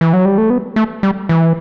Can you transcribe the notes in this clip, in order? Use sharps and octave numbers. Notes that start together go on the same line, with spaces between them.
E3
F#3
G3
A3
B3
A3
G3
E3